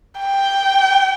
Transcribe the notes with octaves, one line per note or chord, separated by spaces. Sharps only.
G5